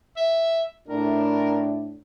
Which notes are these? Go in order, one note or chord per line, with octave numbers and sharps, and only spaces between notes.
E5
A2 D4 A#4